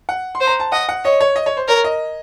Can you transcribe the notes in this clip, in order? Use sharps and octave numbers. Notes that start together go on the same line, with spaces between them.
F#5
C6
C5
A#5
A5
D#5 F#5
F#5
C#5 D#5
C#5
D#5
C#5
C5
A#4 C#5
D#5